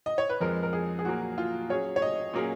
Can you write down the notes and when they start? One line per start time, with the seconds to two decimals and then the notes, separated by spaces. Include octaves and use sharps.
0.06 D#5
0.18 C#5
0.29 B4
0.40 F2 F3 G#3 A#4
0.63 A#4
0.73 G#4
0.99 G#4
1.05 A#2 F#3 A#3 F#4
1.38 F4
1.69 F#3 C#4 G#4 C#5
1.96 C#5
2.02 D#5
2.34 A#2 F#3 A#3 C#4 G#4